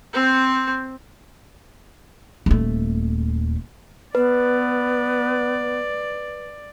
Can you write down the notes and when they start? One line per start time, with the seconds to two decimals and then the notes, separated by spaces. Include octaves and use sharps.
0.13 C4 C5
2.46 D#1 A3
4.15 B3 B4 D5